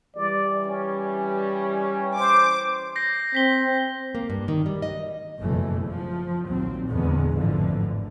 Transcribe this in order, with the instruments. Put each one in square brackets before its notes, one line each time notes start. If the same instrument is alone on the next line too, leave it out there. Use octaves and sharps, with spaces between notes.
[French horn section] E3 G3 [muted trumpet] D5
[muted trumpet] C#4
[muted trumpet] C5 [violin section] D6
[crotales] G6 A#6 C7
[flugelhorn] C4 [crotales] B6 G7
[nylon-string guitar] A#3
G2
D#3
G3
D#5
[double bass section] F#1 F2 B2 E3 A3
F3
A#1 D#2 A#2 F#3 C4
E2 A#2 D3 G#3 B3
G#1 F2 A2 D3 E3 F3